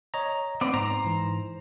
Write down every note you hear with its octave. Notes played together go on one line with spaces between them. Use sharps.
C#5 D#5 A#5
B3 C4 D5
G#2 C5 A#5
G#2 E3